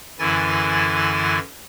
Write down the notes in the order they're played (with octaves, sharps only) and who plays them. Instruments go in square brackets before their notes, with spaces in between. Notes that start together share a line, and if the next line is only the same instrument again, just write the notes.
[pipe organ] F#2 D3 E3 E4 G#5 A6